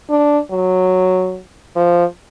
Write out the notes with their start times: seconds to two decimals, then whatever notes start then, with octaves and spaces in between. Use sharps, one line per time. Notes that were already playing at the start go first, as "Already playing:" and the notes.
0.10 D4
0.51 F#3
1.76 F3